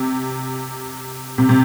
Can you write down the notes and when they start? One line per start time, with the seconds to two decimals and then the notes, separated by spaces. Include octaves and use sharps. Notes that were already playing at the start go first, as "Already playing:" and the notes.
Already playing: C3
1.38 C3
1.49 C3